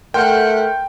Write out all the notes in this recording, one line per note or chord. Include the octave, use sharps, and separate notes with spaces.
A3 A#4 F#5 G5 C6 F6